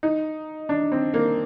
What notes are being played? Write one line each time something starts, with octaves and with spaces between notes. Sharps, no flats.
D#4
D4
C4
A#3